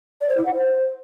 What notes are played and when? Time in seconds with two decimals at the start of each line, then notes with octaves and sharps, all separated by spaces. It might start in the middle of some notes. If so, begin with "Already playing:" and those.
0.21 D5
0.29 C5
0.37 E4
0.45 F#5
0.54 C5